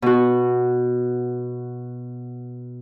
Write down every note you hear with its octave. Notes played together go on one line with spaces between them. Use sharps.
B2 F#4